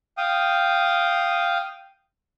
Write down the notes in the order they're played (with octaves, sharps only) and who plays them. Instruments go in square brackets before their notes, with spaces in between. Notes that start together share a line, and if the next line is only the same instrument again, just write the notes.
[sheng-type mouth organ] F5 G5 D#6